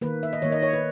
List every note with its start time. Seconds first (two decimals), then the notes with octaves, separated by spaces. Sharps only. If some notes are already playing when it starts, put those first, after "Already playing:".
0.01 D#3 A#3 B4
0.23 E5
0.33 D#5
0.42 D#3 A#3 C#5
0.52 D#5
0.63 C#5
0.73 B4